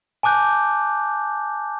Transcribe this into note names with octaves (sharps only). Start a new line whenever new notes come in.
G#5 A5 D6 F#6 G6